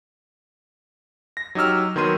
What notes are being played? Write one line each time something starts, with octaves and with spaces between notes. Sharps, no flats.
A#6
F#3 D#4 G4 E6 F6
D#3 F#3 B3 C6 D#7